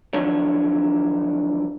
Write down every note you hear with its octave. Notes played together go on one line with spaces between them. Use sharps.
D3 D#3 F3 F#3 D4 C#5